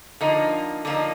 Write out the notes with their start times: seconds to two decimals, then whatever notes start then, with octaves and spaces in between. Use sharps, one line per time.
0.21 D3 F3 A#3 D#4
0.85 D3 F3 A#3 D#4